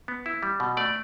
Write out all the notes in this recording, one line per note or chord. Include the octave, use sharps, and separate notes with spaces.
B3
E4
G3
B2
A3 D5